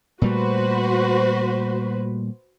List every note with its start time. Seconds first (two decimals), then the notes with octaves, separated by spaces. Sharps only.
0.22 A#2 G3 A3 F#4 B4 C5